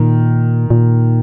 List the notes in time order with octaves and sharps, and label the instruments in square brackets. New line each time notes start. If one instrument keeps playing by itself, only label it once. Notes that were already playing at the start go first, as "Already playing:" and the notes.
Already playing: [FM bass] A#2 [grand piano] D#3
[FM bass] A#2